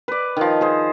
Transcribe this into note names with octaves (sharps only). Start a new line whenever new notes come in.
B4 D5
D#3 F3
G#4 C5